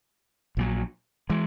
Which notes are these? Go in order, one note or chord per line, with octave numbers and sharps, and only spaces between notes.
A#1 A#2 F#3
E3 G#3